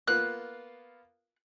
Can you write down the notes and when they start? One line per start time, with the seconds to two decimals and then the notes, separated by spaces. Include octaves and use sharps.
0.07 A#3 B3 F4 F#6